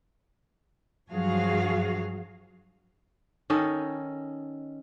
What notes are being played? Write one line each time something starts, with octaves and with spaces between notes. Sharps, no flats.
G2 F3 F#3 F#4 G#4 F5
D#3 C#4 A4 D#5